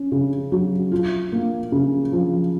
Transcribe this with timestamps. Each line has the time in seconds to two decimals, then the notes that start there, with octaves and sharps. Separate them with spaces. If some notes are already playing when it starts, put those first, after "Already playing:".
Already playing: C#4
0.12 C#3
0.52 F#3
0.92 F4
1.32 A#3
1.72 C#3
2.12 F3